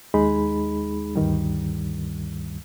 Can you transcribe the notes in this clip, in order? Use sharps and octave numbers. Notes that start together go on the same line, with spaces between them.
D#2 G#3 D#4 G#4 B5
D2 G2 D#3 G3